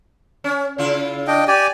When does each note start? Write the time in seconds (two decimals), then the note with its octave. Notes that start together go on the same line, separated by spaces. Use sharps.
0.44 C#4
0.78 C#3 E4 F4
1.27 D4 D#5 G5
1.48 G4 D5 G#5